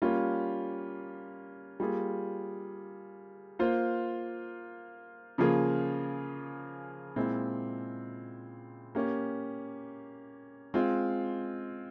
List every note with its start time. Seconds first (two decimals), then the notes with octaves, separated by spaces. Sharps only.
0.02 G3 A#3 C#4 F4
1.80 G3 A#3 F4 G#4
3.59 A#3 F4 C5
5.38 C#3 F3 A#3 F4 G#4
7.16 A#2 G#3 C4 E4
8.95 A#3 C#4 G4
10.74 G#3 C4 F4